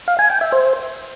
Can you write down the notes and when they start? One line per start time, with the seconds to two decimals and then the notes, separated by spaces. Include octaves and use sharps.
0.08 F5
0.19 G#5
0.30 G5
0.41 E5
0.52 C5